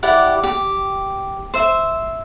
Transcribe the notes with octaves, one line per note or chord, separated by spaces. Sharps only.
E4 G4 D5 F#5
G4
C5 E5